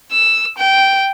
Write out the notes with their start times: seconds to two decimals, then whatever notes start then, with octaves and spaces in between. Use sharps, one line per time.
0.12 E6
0.58 G5